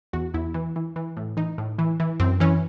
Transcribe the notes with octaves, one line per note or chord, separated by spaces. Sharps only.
E2 F#4
E2 E4
E3
E3
E3
A2
E3 D#4
A2
E3
E3
F#2 C4
E3 C#4